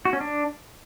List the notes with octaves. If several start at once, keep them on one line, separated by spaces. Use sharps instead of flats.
F#4
C#4
D4